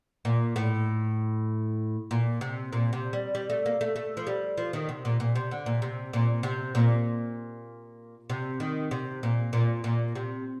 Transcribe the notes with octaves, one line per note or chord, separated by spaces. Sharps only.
A#2
A2
A#2
C3
A#2
C3
G3
G3
A3
A#3
A3
A3
F3
G3
F3
D#3
C3
A#2
A#2
C3
D3
A#2
C3
A#2
C3
A#2
C3
D#3
C3
A#2
A#2
A#2
C3